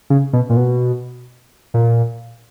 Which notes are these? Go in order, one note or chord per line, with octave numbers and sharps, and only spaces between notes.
C#3
B2
A#2
B2
A#2